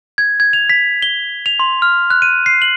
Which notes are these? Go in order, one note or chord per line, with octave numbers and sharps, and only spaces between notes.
G#6
G#6
F7
B6
G7
F7
C6
F6
F#6
D#7
C7
F#7